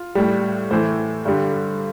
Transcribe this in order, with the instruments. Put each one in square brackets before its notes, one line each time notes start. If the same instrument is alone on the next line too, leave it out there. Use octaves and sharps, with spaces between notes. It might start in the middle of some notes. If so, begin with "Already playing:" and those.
Already playing: [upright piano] F4
A2 G3
A2 E3 A3 C5
G2 D3 G3